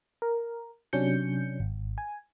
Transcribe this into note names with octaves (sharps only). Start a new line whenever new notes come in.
A#4
C3 F#3 C#4 D4 G6 C#7
G#1
G#5